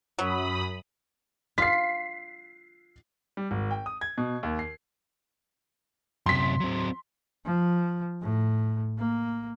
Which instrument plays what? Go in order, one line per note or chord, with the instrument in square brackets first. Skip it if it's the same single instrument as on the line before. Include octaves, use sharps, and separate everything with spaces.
[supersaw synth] F#2 B5 D#6 [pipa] F#3
[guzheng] F4 [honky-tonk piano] B6 C7
[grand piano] G3
G#1
G5
D#6
G#6
B2
D#2
C7
[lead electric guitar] F#2 C3 [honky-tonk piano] C6 B6
[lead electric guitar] F#3 C4
[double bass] F3
A2
A#3